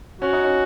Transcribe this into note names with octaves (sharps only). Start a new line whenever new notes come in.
C#4 F#4
D#4
C#4